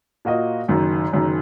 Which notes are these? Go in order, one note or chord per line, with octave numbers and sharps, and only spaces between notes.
A#2 A#3 F#4 D#5
F#1 F#2 D#3
F#1 F#2 D#3